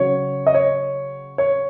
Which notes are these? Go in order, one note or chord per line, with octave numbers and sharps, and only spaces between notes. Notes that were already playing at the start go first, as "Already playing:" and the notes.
Already playing: C#3 F#3 C#5
D#5
C#5
C#5